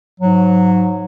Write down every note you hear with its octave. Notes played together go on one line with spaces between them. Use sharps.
G#2 F#3